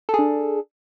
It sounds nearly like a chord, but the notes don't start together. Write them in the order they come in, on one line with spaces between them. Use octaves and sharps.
A4 G#4 D4